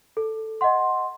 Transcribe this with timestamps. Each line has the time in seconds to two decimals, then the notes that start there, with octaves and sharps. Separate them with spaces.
0.17 A4
0.61 D#5 F#5 C6